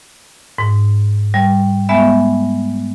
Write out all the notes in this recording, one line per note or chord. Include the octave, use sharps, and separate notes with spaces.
G#2
G3
G#3 B3 E5